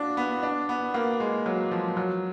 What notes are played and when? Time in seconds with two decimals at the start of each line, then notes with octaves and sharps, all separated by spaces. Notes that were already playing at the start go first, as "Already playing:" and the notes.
Already playing: D4 F4 F#4
0.17 B3
0.43 D4
0.69 B3
0.94 A#3
1.20 G#3
1.46 F#3
1.71 F3
1.97 F#3